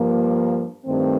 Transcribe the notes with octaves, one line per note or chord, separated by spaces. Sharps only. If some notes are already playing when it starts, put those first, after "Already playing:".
Already playing: G2 F3 A#3
G2 D#3 A3 C4